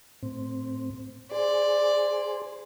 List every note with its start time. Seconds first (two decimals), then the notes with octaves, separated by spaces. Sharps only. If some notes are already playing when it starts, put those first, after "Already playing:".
0.23 A2 C4
1.31 G#4 C5 D5